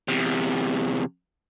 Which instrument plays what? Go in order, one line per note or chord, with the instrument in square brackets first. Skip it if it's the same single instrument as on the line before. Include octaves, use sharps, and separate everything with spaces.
[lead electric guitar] E2 C3